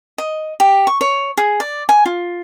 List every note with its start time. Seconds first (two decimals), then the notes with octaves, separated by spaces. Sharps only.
0.18 D#5
0.60 G4
0.87 C#6
1.01 C#5
1.37 G#4
1.60 D5
1.89 G#5
2.06 F4